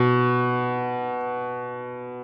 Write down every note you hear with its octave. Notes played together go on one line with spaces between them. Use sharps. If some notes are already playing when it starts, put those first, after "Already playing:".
Already playing: B2